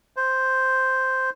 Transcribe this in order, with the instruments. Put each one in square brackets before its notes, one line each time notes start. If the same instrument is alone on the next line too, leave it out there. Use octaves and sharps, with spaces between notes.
[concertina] C5